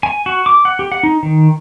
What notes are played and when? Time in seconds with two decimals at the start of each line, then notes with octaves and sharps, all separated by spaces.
0.03 G#5
0.26 F#4
0.46 D6
0.65 F#5
0.79 G4
0.92 F#5
1.03 D#4
1.23 D#3